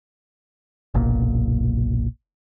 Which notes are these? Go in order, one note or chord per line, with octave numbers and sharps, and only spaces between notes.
F#1 B1 A#2